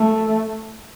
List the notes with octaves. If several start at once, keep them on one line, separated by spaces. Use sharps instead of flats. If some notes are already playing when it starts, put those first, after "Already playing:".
Already playing: A3